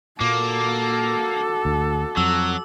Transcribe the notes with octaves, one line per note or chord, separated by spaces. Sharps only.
A#2 A#3 F#4 A4 D6
D2
F2 F#3 E6